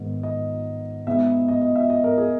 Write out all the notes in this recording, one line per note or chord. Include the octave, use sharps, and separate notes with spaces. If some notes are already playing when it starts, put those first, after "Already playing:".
Already playing: G#2 D#3 G#3 B3
D#5
B2 G#3 B3 D#4 E5
D#5
D#5
E5
D#5
A#4
G#4